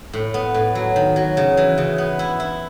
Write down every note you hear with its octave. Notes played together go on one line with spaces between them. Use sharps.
A2
B3
A2
F#3
D#3
F#3
C#3
E3
C#3
B3
E4
E4